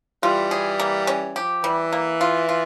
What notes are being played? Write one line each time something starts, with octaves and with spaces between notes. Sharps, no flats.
E3 G3 F4
G#4
A#3
C#4
F3 G4
E3 G3
A#3
F4
F4